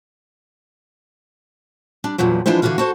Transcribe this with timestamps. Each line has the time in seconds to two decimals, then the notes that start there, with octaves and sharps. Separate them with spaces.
2.04 G3 D4
2.18 E2 G2 A#2 F3 F#3
2.46 E3 F3 G#3 D4 E4 C5
2.62 D3 E3 E4 F#4 F5
2.78 F#4 A4 C5